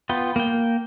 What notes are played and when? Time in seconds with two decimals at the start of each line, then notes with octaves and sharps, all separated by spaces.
0.09 B3 F4 G5
0.36 A#3 G5